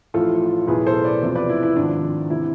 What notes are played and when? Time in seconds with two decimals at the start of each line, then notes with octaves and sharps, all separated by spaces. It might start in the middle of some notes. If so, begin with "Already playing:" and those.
0.14 A1 A2 F3 F4 A4
0.68 B1 A2 E3 G#4 B4
0.87 A4 C5
1.04 B4 D5
1.22 E2 C3 F3
1.35 B4 D5
1.49 E4
1.63 E4
1.76 G#1 G#2 F3 D4
2.30 C3 E3 E4